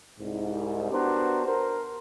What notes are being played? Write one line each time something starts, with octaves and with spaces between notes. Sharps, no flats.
C2 G#2
B3 D4 F#4 G4 A#4 C5
A#4 C5